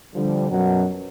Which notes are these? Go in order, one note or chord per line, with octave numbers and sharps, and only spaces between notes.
D3 F3 G3
F#2 B2 F#3